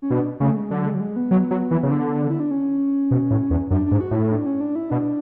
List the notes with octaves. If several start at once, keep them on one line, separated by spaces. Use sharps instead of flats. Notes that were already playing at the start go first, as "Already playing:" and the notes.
C#4
B2 D4
C#3 A3
G#3
D3 F#3
G#3
F#3
G#3
B3
F#3
F#3
E3
C#3
D3
E4
D4
C#4
B2
A2
E2
F#2 D4
D4
G#2
F#4
A2 E4
D4
C#4
D4
E4
B2 D4